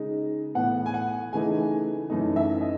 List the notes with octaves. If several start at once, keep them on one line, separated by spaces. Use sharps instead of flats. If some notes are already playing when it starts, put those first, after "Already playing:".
Already playing: C#3 G#3 D#4
A2 E3 B3 F#5
G#5
F#5
C#3 E3 A3 D#4 G#5
F#2 E3 A3 D#4
E5
D#5